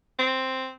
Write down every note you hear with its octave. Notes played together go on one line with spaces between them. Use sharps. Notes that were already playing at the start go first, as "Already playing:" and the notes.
C4